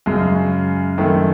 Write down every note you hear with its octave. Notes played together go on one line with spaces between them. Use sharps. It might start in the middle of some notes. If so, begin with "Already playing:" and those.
F#2 C#3 G#3
F#2 D#3 A3 E4